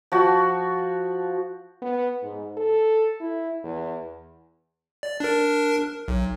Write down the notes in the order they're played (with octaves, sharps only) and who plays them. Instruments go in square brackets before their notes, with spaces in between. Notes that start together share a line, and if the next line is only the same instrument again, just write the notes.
[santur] F3 F#4
[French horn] B3
G#2
A4
E4
E2
[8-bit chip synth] D5
D4 A#4
B1